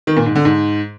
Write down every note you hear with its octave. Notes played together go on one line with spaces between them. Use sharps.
D#3
A#2
G#2
D3
G#2